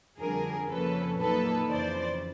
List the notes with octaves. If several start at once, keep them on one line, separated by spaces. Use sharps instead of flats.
F2 D3 G3 G#4 A#4
F2 C#3 F3 A#3 C#4 A4 B4
A#2 F#3 A#3 D#4 A4 B4
F2 C#3 E3 C5 D5